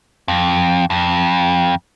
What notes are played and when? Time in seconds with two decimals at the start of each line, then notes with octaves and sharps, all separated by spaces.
0.28 F2
0.90 F2